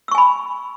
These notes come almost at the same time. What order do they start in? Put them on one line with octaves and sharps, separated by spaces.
E6 C#6 G#5 B5